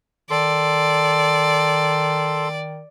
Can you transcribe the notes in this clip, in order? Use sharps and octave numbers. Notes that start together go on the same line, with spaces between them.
D#3 A4 D5 C6